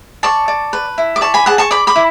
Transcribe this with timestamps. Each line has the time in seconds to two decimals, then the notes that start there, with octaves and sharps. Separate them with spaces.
0.23 D5 A5 C#6
0.48 D5
0.73 B4
0.98 E4
1.16 D6
1.21 D5 A5 C#6
1.34 G#5 B5
1.46 G#4 F#5 A5
1.58 A5 C#6
1.71 D5 B5 D6
1.87 B5 D6
1.96 E4